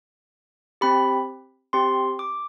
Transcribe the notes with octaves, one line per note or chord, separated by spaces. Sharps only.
C4 G4 B5
C4 G4 C6
D6